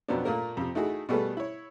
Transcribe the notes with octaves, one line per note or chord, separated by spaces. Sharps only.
F2 B2 F#3 B3 C4 D4
A#2 A3 A#3 A#4
F2 C3
A3 D#4 E4 F#4 G#4
B2 G3 A3 G#4 A4 B4
E4 C#5